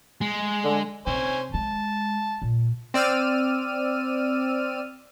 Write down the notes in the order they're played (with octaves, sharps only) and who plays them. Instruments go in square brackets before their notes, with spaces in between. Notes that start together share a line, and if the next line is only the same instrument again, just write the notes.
[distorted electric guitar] G#3
[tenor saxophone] D3
[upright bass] C3 [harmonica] C5 C#5 G#5
[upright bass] G#3 [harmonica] A5
[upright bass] A#2
[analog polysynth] C4 D5 E6 F6 D#7